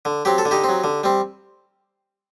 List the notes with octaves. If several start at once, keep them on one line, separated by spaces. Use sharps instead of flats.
D3
F#3 C4 G4
A4
D3
D#4 G4
F#3 C4
D3
G3 C4